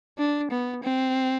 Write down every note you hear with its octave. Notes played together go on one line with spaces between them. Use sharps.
D4
B3
C4